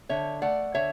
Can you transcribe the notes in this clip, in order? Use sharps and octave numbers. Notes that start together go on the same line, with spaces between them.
D3 C#5 E5
A3 D5 F#5
D3 C#5 E5